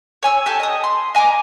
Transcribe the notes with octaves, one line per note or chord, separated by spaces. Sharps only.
C#5 G#5 E6
G4 A4 G#5 A5
D#5 D#6
C6
D#5 G#5 A#5 D6